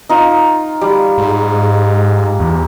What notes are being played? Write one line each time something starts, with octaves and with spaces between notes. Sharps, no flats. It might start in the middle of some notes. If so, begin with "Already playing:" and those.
D#4 F4
G3
G#2
E2